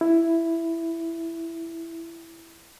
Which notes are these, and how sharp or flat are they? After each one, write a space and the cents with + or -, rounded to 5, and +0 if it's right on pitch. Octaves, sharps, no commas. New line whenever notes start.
E4 +5